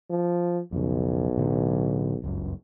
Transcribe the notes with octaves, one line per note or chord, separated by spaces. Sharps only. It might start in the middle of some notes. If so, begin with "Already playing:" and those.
F3
B1 F2 C#3
A2 D3 F#3
G1 C#2 F#2